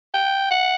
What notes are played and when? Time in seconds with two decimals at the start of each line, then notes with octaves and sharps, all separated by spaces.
0.14 G5
0.51 F#5